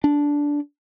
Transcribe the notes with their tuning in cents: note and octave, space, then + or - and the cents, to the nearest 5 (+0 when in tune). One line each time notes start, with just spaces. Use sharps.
D4 -10